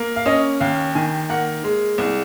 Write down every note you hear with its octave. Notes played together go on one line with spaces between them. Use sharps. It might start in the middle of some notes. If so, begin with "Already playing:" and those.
Already playing: A#3
F5
C#4 D#5
D#2 F5
D#3 G#5
A#3 F#5
G#3
C2